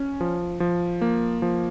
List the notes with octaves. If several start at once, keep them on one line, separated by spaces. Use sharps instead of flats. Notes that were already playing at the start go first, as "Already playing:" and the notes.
Already playing: C#4
F3
F3
A#3
F3